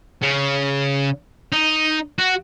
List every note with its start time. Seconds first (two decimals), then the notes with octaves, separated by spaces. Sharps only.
0.23 C#3
1.52 D#4
2.18 F#4